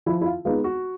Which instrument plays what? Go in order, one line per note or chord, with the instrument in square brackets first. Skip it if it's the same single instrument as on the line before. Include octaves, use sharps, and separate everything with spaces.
[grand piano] F3 E4
E4
F4
G#3 B3 D#4 F4
F#4